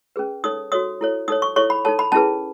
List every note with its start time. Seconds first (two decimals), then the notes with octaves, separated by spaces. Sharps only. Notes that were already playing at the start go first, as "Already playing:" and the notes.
0.16 C#4 G#4 B4
0.44 D#4 A4 C#5 D#6
0.72 F#4 A4 C#5 D#6
1.01 E4 A4 C#5
1.28 D#4 A4 C#5 D#6
1.42 C#6
1.56 E4 A4 C#5 C#6
1.70 B5
1.85 D#4 A4 C#5 A5
1.99 B5
2.12 C#4 E4 G#4 B4 A5